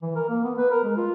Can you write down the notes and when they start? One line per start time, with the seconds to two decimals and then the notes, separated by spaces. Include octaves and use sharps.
0.02 E3
0.16 A#4
0.29 A#3
0.44 B3
0.58 B4
0.71 A#4
0.84 G#3
0.97 F4